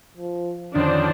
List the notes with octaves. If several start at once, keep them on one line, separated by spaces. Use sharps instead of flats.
F3
F2 D3 D#3 C#4 D4 C5